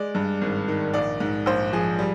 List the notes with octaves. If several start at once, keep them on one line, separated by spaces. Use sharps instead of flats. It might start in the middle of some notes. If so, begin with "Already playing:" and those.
Already playing: G#3 D5
G2
G#1
D#3
A#1 D5
G#2
A#1 C5
F3 G#4
G3